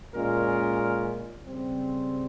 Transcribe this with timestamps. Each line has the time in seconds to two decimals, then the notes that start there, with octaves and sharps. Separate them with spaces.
0.14 A#2 G#3 C#4 F4 A#4
1.46 C#3 G3 C4